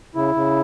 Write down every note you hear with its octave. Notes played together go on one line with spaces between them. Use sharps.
C#3 E4
C#3